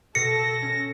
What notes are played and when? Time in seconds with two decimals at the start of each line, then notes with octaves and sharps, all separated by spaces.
0.15 B2 A4 A#6 C#7
0.62 C#4